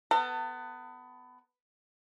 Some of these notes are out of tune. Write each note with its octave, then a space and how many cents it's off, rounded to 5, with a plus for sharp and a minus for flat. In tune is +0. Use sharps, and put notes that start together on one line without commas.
B3 +20 A4 +45 A5 +35